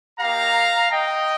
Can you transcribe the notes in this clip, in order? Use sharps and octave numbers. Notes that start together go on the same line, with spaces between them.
A#3 D#4 G4 F5 A#5
D#5 G5